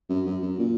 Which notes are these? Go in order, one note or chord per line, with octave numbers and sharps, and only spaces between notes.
F#2
F#2
F#2
A#2